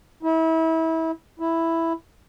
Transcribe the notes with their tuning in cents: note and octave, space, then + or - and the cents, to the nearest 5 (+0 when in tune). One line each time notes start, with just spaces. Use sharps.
E4 -30
E4 +0